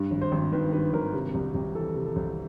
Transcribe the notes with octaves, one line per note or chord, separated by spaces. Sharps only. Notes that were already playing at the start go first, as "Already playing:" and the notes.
Already playing: G2
G#1
C5
G#1
D#3 B4
G2 B4
G#1 A#4
C3
C2
C2
E3 A4
C3
A4
C2